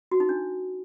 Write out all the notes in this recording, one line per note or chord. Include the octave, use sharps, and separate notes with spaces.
F#4
D#4
D4